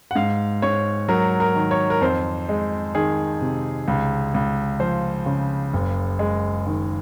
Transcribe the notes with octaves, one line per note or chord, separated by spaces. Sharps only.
F#5
G#2 F5
G#2 C#5
F#3 A#4
A#4
D#3
C#5
A#4
F2 C5
G#3
D#3 G#4
C3
C#2
C#2
F3 C5
C#3
F#1
G#3
D#3